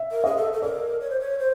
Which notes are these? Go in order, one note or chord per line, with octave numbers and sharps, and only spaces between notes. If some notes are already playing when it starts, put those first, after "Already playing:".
Already playing: E5
A#4
G#4 D#5
A4
A4
A#4 D5
C#5
C5
C#5
C5